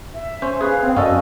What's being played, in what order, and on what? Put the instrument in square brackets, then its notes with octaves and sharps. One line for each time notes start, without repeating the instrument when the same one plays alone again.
[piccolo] E5
[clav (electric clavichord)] C#4 C5
[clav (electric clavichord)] G#4 B4 [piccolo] F5
[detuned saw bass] C4
[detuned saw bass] F#2 [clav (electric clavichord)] C#4 A4 [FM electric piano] D5 F5 [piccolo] D#5